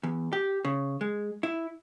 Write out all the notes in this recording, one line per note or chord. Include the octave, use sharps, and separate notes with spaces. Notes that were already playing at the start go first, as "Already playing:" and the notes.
E2
G4
C#3
G#3
E4